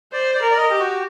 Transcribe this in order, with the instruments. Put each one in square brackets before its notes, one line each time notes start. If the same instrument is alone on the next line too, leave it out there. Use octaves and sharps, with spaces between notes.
[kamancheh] C5 [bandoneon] D5
[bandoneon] D5
[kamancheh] A#4
[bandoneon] D5
D#5
[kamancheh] G4
[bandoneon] F#4